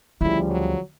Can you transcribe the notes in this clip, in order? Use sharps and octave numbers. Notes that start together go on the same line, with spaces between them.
D2 C#3 F3 G3 E4
F#3